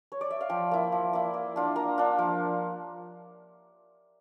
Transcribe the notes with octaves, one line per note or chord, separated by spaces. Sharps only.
C#5
D5
E5
F5
F3 G5
A#3 E4
F3
A#3 E4
A#3
D4 F4
A#3 A#5
D4 F4
F3